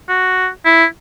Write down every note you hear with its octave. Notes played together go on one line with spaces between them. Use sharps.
F#4
E4